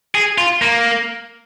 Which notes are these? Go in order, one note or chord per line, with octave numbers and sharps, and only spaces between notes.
G#4
F4
A#3